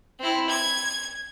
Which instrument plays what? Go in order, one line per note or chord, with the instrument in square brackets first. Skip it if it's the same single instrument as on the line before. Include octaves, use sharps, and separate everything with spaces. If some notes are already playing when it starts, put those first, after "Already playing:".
[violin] C4 E4
G#6